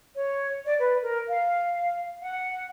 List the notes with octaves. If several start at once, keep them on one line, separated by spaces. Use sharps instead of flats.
C#5
D5
B4
A#4
F5
F#5